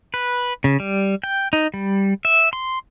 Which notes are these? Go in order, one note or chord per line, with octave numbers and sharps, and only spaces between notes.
B4
C#3
G3
G5
D#4
G3
E5
C6